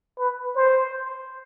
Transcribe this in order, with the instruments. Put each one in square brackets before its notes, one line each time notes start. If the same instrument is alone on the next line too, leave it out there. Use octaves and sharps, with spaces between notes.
[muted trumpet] B4
C5